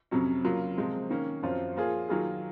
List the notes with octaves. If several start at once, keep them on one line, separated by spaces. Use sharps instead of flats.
F2 C3 F#3 C#4
C#3 F#3 A#3 F4
C3 F3 G#3 C4
D#3 A#3 C#4
F#2 F3 C4 F4
F3 A#3 F4 G#4
D#3 F#3 A#3 F4 G#4